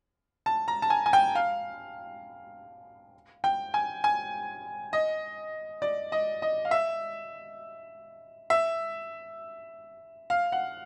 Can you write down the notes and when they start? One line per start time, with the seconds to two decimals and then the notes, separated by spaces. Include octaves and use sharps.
0.46 A5
0.68 A#5
0.82 A5
0.90 G#5
1.06 G#5
1.13 G5
1.35 F5
3.44 G5
3.74 G#5
4.04 G#5
4.93 D#5
5.82 D5
6.12 D#5
6.42 D#5
6.65 F5
6.71 E5
8.50 E5
10.30 F5
10.52 F#5